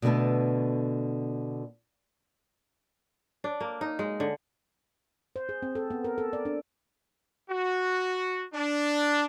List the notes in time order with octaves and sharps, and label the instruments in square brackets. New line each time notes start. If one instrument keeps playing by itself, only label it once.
[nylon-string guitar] B2 D3 A3 B3 A4
[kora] D4
A#3
D#4
G#3
D3
[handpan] C5
G#4
C4
A4
B3
A#4
A4
D5
D4
[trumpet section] F#4
D4